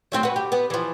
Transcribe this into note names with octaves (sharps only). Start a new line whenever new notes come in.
F#3 A3 C4
F#4 B4
G4
B3
E3 F3